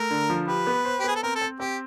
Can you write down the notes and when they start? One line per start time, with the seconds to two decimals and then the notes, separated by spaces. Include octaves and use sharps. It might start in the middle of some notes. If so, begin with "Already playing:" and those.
Already playing: A3 A#4
0.11 D3
0.30 F3
0.48 G4 B4
0.67 B3
0.85 C5
1.00 G4
1.04 B3 G#4
1.15 A4
1.23 C4 A#4
1.35 A4
1.41 C4
1.60 C4 G4